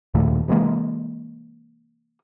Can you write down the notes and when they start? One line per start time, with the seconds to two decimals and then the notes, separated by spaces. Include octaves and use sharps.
0.14 D#2 A#2 D#3 A3
0.48 C3 E3 G#3 A#3